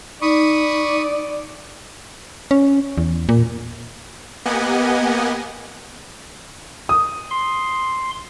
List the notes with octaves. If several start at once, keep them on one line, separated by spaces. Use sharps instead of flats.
D#4 D5 B5 C#6 D#6
C#4
E2
A#2
A#3 B3 G4 D#5 F#5 G#5
D#6
C6